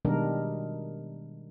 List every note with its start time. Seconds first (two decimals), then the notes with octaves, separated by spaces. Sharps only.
0.05 B2 D#3 G3 G#3 D4 A#4